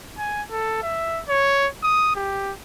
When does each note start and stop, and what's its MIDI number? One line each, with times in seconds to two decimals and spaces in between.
0.18 0.42 80
0.50 0.82 69
0.83 1.21 76
1.29 1.67 73
1.83 2.12 87
2.16 2.52 67